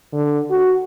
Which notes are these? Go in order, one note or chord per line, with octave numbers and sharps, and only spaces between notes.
D3
F#4